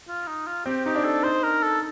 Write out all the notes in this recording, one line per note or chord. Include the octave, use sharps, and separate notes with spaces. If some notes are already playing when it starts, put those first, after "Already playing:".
F4
D#4
F4
C4 G4
D#4 G4
D4
A4
D#4 C5
A#4
A4